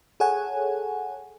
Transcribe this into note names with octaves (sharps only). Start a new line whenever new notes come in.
G#4 A4 C#5 F#5 G#5